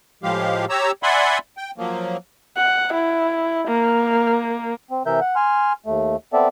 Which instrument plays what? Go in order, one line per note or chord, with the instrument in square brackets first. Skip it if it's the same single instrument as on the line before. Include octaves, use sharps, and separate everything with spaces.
[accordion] A2 F3 G#3 G4 F5
G4 C#5 A#5 E6
D5 E5 F#5 G#5 B5 C6
G5
F3 F#3 A#3
[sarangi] F#5
E4
A#3
[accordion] C4
C3 E3 A#4 E5 G6
F#5
G#5 C6 F6
D#2 A3
B3 C4 A4 D5 E5